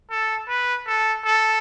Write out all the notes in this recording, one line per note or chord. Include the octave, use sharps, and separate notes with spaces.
A4
B4
A4
A4